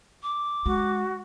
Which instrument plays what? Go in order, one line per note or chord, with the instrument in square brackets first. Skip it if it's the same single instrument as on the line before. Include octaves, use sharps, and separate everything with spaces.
[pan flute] D6
[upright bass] G#3 [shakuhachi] F#4